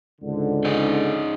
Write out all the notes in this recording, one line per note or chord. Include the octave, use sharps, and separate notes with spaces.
C#2 G#2 D3
C#4 D#4 G#4